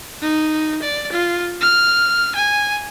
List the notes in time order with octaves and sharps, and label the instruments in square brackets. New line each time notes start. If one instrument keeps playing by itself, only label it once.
[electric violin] D#4
D5
F4
F6
G#5